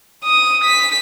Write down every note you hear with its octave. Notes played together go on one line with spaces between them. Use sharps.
D#6
B6